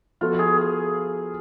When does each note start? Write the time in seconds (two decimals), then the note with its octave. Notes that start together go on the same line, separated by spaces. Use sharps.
0.21 F3 B3 F4 F#4 A4
0.39 G#4
0.57 G#4